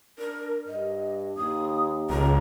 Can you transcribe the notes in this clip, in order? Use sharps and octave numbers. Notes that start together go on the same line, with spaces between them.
D4 A#4
G2 D#5
D#2 D#6
C#2 A#5